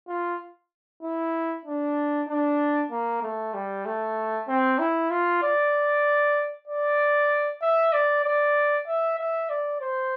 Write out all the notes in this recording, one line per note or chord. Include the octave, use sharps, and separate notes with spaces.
F4
E4
D4
D4
A#3
A3
G3
A3
C4
E4
F4
D5
D5
E5
D5
D5
E5
E5
D5
C5